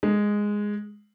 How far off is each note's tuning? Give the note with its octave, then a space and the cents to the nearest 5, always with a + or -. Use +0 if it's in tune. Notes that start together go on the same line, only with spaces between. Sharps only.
G#3 -5